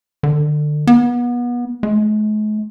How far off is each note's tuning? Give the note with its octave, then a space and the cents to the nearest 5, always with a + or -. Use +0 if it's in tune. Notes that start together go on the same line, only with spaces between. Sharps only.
D3 +30
B3 -30
G#3 +45